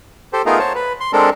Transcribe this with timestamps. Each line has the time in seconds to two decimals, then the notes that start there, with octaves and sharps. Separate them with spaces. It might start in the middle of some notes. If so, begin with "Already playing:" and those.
0.33 G4 A4 C5
0.46 A3 B3 D#4 F4 G#4 A#4
0.59 C5 C#5 A5
0.75 B4
1.00 C6
1.13 G#3 C4 D4 A4 A#4